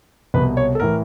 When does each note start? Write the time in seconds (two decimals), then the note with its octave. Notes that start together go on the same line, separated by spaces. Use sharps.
0.34 C2 B2 B4
0.57 C#5
0.75 A4
0.80 A2 E3 A#4